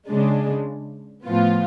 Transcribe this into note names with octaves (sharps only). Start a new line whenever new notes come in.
C#3 G#3 D4
A2 F3 B3 F4